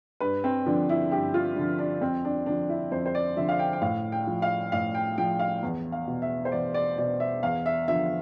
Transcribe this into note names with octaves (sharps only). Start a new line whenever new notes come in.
G2 B4
C4
D3 F3 D4
E4
G2 G4
F4
D3 F3
D4
F2 C4
D4
D3 F3 D4
E4
F2 C5
C5
D5
D3 F3 E5
F5
G5
G5
A2 F5
G5
F3
F5
A2 F5
G5
F3 G5
F5
E2
F5
B2
E5
C5
E2 D5
D5
B2 D5
E5
E2 F5
E5
D3 F3 E5